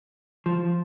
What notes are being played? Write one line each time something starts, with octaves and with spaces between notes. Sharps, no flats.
F3